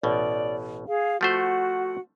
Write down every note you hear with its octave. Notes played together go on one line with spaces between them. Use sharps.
A1 B2 D5
G#4 F5
F3 A3 F#4 C5 F#5